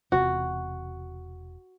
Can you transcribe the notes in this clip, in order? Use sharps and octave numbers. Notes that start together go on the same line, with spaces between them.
E1 C3 F#4